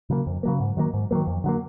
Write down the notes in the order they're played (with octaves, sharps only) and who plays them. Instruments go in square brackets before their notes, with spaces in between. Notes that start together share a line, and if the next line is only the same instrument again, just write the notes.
[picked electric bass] C#3 F#3 A#3
F2
C#3 F#3 A#3
G#2
D#3 F#3 A#3
G#2
D#3 F#3 A#3
F2
D3 F#3 A#3